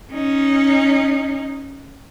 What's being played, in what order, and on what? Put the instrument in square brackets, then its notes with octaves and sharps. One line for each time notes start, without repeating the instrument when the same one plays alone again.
[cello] C#4 D#4